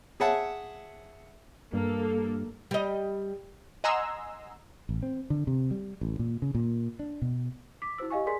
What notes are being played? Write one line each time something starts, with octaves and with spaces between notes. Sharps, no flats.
G#4 C#5 E5 F#5 A5
G2 A#3 A4
G3 D#5
D#5 F#5 G#5 A#5 C6 E6
A1
C4
D3
C3
G3
A1
A#2
C#3
A#2
D4
B2
D6 B6
E4 F#4 C5 E6
G4 D#5 F5 G#5 C#6
G#4 A#4 D5 G#5 C6 B6